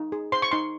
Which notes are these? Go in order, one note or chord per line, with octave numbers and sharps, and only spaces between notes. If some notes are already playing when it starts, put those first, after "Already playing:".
Already playing: D#4
G#4
C5 C6
C#6
D#4 C6